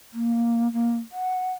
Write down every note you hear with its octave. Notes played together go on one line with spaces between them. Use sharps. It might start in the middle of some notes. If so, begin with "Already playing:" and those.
A#3
A#3
F#5